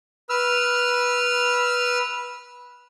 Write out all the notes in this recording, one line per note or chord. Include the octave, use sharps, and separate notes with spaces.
B4 E6 F6